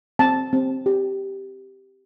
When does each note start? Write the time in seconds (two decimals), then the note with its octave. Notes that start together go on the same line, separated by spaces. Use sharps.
0.19 C4 A5
0.53 C4
0.86 G4